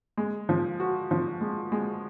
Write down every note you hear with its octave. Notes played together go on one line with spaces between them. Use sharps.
G#3
F3
F#4
F3
G#3
G#3